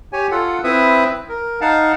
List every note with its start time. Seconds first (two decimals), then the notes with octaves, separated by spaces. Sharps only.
0.13 G4 C#5 G#5
0.31 F4 A4 F#5
0.64 C4 E4 B4 E5 D#6
1.29 A#4
1.61 D#4 F5 F#5 A5